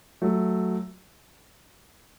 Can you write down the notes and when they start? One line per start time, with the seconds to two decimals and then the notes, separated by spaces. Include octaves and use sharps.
0.22 F#3 A3